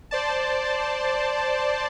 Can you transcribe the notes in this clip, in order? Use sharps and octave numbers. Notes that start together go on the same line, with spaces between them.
C5 D5 A5